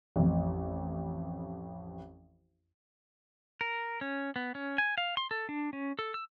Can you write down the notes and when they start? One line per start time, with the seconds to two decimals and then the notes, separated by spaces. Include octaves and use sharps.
0.16 A1 F2
3.61 A#4
4.01 C#4
4.36 B3
4.55 C#4
4.78 G#5
4.98 F5
5.17 C6
5.31 A4
5.49 D4
5.73 C#4
5.99 A4
6.14 E6